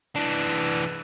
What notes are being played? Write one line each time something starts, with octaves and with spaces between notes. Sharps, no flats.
E3 D4